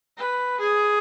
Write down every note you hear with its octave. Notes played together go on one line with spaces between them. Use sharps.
B4
G#4